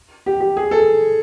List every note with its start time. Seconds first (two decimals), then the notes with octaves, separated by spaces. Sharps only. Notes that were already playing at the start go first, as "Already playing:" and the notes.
0.26 G4
0.41 G4
0.57 G#4
0.71 A4